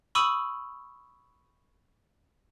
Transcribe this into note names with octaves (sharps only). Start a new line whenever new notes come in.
B5 C#6 D#6 E6 D#7 F#7